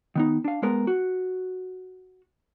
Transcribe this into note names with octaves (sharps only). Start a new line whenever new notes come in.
D#3 B3 D#4
D4 F5
G#3 B3 A#4
F#4